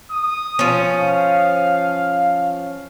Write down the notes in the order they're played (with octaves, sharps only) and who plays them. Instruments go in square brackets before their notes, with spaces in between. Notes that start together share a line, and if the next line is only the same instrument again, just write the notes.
[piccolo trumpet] D#6
[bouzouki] F3 C#4
[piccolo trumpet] F5